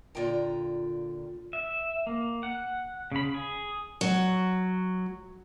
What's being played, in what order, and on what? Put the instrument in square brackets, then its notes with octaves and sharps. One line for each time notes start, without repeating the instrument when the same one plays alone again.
[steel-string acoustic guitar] A#2 D3 A#3 F4 G5 A#5
[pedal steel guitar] E5
A#3
F#5
C#3 B5
G#4
[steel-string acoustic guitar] F#3